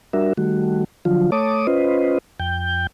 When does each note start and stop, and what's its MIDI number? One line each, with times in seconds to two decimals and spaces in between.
0.13 0.33 55
0.13 0.33 62
0.13 0.33 66
0.13 0.33 70
0.13 0.33 76
0.37 0.84 51
0.37 0.84 55
0.37 0.84 57
0.37 0.84 66
1.05 1.31 50
1.05 1.31 53
1.05 1.31 54
1.05 1.31 65
1.32 1.67 57
1.32 1.67 73
1.32 1.67 81
1.32 1.67 86
1.32 1.67 87
1.67 2.18 61
1.67 2.18 65
1.67 2.18 71
1.67 2.18 72
1.67 2.18 75
2.40 2.87 41
2.40 2.87 79
2.40 2.87 91